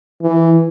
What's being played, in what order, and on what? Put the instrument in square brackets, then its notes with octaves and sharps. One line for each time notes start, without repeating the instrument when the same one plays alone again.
[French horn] E3